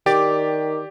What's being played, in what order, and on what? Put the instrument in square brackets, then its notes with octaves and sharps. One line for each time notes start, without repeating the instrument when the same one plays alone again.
[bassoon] D#3 [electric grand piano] G4 [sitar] D5